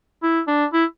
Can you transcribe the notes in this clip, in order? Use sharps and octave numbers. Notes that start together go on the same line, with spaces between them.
E4
D4
E4